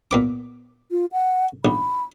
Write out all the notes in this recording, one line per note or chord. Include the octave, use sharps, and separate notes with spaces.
A#2 B3 D6
F4
F#5
A#1 B5